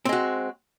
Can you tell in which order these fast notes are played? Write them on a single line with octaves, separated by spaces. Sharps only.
C4 G#3 F#4